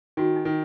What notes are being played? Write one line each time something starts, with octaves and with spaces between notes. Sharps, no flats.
D#3 F#4
D#4
D#3